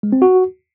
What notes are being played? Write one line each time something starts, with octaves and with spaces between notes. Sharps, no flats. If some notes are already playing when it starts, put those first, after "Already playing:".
G#3
C4
F#4